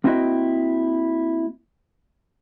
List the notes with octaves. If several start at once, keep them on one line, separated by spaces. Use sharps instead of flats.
A#3 C4 E4 F#4 D#5 G5